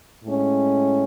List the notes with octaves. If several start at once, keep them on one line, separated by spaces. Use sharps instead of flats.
A2 G#3 C#4